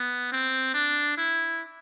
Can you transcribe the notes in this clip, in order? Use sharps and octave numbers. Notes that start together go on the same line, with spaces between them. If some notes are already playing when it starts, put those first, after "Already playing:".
Already playing: B3
C4
D4
E4